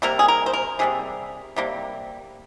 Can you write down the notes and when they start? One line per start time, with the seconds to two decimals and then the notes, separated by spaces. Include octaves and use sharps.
0.02 C3 G3 A#3 A#4
0.19 G#4
0.28 A#4
0.46 C5
0.53 A#4
0.79 C3 G3 A#3 G#4
1.56 C3 G3 A#3